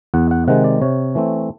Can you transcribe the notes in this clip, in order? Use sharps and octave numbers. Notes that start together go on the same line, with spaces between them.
E2 F#5
F#5
C3 D#3 G#3 F#5
D5
C3 C#5
E3 A3 C4